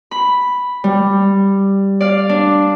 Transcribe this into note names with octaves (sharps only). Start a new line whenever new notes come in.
B5
G3
D5 F5
D4